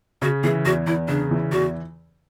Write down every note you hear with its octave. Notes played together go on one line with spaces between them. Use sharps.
C#3 F#4
E3 G#4
E2 F#4
E2 E4
C#3 D4
E3
E2 F#4